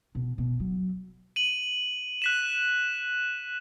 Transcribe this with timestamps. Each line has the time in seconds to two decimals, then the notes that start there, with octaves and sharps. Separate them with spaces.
0.15 B2
0.38 B2
0.60 F#3
1.36 D#7 F#7
2.22 F#6 B6 E7